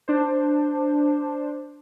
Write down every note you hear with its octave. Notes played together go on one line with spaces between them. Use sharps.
D4 C5